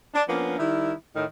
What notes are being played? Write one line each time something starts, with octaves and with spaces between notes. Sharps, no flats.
D4
F3 A#3 B3 C#4 D4
D#3 G3 E4
A2 D#3